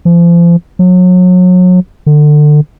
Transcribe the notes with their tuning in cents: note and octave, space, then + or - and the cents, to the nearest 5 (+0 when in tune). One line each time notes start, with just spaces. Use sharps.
F3 -35
F#3 -30
D3 +25